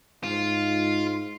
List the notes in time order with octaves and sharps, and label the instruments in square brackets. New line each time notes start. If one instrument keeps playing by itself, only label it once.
[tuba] G#2 [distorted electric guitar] F4